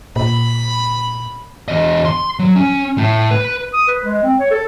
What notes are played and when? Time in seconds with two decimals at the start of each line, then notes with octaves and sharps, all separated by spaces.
0.16 A#2 B5
1.68 E2 D#5
2.05 C6
2.39 F#3
2.56 C#4
2.98 A2
3.31 B4
3.74 D#6
3.88 B4
4.05 G#3
4.23 C4
4.39 C#5
4.51 A4